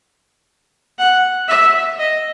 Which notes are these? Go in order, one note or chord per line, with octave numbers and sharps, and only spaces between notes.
F#5
E5
D#5